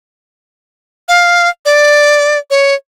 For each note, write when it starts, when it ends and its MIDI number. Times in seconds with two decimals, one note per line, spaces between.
1.08 1.49 77
1.65 2.38 74
2.50 2.74 73